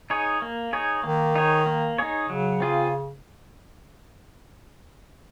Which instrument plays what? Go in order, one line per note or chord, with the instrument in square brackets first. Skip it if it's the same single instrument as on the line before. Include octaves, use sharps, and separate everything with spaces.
[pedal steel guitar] D#4 G#4 C#5
A#3
D#4 G#4 C#5
[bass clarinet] D#3 [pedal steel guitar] A#3
[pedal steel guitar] D#4 G#4 C#5
A#3
D#4 G#4 C#5
[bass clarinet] C#3 [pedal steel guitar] F#3
[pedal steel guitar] C4 F4 G#4